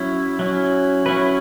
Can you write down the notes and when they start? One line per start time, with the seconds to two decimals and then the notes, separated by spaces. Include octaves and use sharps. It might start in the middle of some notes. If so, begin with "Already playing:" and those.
Already playing: F#3 C#4 E4
0.39 F#3 C#4 E4
1.06 F#3 C#4 E4 B4